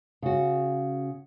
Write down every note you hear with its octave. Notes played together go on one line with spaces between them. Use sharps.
C#3 F#4